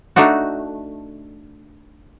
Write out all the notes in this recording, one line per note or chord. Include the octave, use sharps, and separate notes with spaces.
A3 D4 D#4 F#4